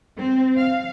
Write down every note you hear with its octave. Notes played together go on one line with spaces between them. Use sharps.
C4
F5